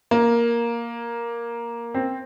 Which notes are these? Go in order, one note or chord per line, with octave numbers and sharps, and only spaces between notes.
A#3
C4